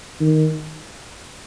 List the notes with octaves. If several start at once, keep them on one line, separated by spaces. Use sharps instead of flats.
D#3